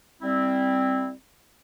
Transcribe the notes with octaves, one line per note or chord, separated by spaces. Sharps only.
G3 C4 E4